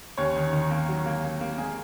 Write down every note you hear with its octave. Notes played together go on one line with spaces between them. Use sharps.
D#2 C#4 C#5
D#3
D#3
A#3
F#3
A#3
A#3
A#3
G#3 A#3 G#4